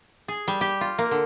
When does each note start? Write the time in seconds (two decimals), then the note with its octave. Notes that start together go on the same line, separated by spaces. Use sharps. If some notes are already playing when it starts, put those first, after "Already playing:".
0.28 G#4
0.48 G3
0.61 G4
0.81 F4
0.99 A#3
1.11 D3